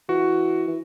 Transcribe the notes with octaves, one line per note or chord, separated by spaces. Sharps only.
E3 F#4
E3